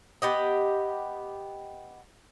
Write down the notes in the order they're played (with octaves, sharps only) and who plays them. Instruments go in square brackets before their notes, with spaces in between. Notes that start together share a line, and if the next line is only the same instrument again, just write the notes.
[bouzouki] B3 G4 D#5